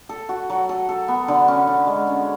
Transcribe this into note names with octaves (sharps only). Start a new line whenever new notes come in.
A4
F#4
F#3
A4
A4
B3
D3
C#4
D3
G#3
C#4